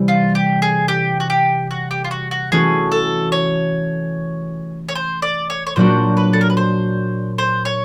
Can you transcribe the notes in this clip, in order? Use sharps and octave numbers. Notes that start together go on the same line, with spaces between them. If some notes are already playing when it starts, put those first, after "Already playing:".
Already playing: C3 E3 G3
F4
G4
G#4
G4
F#4
G4
F#4
G4
F4
F#4
F#4
E3 A3 C#4 F#4 G#4
A4
C#5
C#5
C5
D5
C#5
C#5
A#2 F#3 A#3 D4 F#4 C5
B4
A4
A#4
B4
C5
C5
C#5